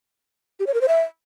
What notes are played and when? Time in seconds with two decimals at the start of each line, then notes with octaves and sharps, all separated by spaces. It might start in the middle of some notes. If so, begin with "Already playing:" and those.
0.59 G4
0.67 C#5
0.74 A#4
0.81 C5
0.88 E5